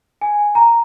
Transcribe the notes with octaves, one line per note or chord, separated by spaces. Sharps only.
G#5
A#5